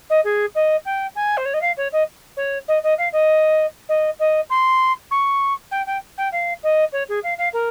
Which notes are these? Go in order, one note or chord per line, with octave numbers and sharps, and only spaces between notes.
D#5
G#4
D#5
G5
G#5
C5
C#5
D#5
F5
C#5
D#5
C#5
D#5
D#5
F5
D#5
D#5
D#5
C6
C#6
G5
G5
G5
F5
D#5
C#5
G#4
F5
F5
A#4